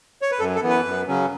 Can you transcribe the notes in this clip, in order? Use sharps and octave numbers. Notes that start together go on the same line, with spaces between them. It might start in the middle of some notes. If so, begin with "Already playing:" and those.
C#5
B4
F#2 A4
A4
E3 B3
B4
F#2
C#3 F#3 C#4